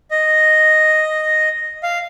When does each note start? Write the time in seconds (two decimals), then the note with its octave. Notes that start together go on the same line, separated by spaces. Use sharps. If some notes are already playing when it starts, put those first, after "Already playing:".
0.11 D#5
1.83 F5